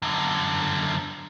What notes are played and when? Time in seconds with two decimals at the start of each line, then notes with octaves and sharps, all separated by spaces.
0.02 F#2 D3